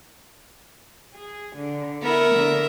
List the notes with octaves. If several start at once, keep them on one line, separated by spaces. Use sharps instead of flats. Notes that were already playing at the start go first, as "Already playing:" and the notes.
G#4
D3
B3 E4 A#4 E5
D3